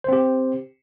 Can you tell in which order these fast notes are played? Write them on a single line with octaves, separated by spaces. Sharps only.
C5 C4 G4